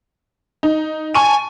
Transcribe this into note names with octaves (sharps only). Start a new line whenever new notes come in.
D#4
G#5 A5 C#6 D#7